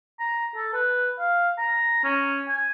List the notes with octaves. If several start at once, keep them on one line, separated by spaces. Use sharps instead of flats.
A#5
A4
B4
F5
A#5
C#4
G#5